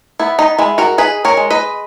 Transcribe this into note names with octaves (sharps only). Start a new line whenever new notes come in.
B3 E4
D#4
G#3 E4
F#4 A#4
D#4 G#4 B4
A#4 C#5
G#3
B4 D#5